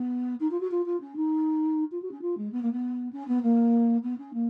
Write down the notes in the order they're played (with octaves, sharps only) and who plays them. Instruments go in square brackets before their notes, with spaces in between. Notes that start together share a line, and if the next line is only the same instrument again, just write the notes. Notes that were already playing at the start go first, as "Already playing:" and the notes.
Already playing: [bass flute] B3
D#4
F4
F#4
F4
F4
C#4
D#4
F4
F#4
C#4
F4
G#3
B3
A#3
B3
C#4
B3
A#3
B3
C#4
A#3